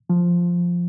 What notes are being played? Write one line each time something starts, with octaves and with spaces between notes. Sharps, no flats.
F3